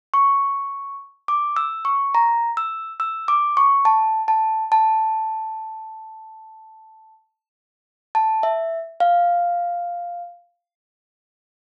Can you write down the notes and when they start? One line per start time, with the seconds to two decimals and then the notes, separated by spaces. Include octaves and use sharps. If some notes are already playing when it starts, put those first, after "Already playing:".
0.14 C#6
1.28 D6
1.56 E6
1.85 C#6
2.15 A#5
2.57 E6
3.00 E6
3.28 D6
3.57 C#6
3.85 A5
4.28 A5
4.72 A5
8.15 A5
8.43 E5
9.00 F5